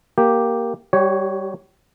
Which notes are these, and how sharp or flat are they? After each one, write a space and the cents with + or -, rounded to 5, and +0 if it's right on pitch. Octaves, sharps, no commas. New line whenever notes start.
A#3 +0 G4 +0
G3 +0 G4 -40 C#5 +0